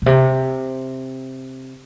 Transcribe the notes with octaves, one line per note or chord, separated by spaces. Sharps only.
A#2
C3